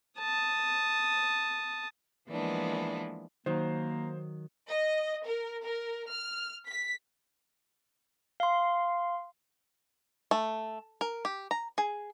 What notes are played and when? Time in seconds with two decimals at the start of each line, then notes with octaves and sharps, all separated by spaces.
0.20 A5 D#6
2.28 E3 F3 G#3 A#3 B3 D4
3.46 D#3 F#3 A#3 C5
4.68 D#5
5.24 A#4
5.63 A#4
6.10 F6
6.67 B6
8.40 F5 C6
10.31 A3
11.01 A#4
11.25 G4
11.51 A#5
11.78 G#4